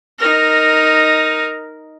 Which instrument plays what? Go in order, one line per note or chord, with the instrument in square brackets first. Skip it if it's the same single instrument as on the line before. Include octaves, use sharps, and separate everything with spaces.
[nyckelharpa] D#4 A#4